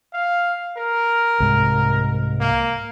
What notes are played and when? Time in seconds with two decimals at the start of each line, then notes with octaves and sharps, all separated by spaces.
0.13 F5
0.77 A#4
1.40 C2 G#2
2.40 A#3